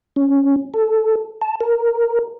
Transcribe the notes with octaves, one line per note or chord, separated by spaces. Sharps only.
C#4
A4
A5
A#4